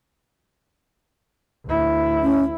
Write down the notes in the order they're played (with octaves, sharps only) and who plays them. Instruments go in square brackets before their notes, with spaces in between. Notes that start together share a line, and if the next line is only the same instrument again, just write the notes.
[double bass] D2 E4
[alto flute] C#4